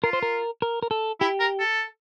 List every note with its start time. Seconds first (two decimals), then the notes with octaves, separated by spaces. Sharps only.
0.04 F4 A#4
0.13 C5
0.23 A#4
0.62 A#4
0.83 A#4
0.91 A4
1.21 E4 G4
1.40 A#4
1.59 A4